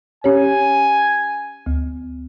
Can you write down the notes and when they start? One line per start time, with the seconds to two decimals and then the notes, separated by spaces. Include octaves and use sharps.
0.24 C#4 G4 C#5 G#5
1.66 D2